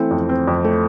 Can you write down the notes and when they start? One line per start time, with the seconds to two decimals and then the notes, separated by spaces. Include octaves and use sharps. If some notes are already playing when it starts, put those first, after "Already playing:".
Already playing: E3 A3 C4
0.11 F2
0.29 C4
0.47 F2
0.65 A3